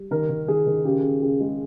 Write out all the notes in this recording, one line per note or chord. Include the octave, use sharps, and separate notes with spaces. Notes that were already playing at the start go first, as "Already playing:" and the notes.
Already playing: G3
D#3 A#4
D#3
D#3 G#4
D#3
C#3 G4
C#3
C#3
G#3